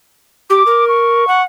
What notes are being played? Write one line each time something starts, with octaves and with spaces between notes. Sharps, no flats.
G4 D6
A#4
C#6
F#5